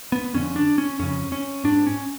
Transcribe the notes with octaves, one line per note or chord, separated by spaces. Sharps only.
B3
F2 D3 C#4
D4
C#4
F2 C#3 C#4
C#4
G#2 D4
C#4